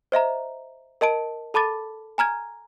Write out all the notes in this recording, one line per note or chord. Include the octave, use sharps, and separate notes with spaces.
C5 D#5 E5 A#5
A#4 D#5 A5 D7
A4 A5 B5 D6 A6
G#5 A#5 F6 G#6